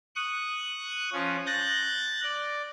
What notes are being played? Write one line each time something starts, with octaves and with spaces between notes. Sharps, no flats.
C#6 D#6 F#6
F3 C#4
F#6 G6 A6 A#6
D5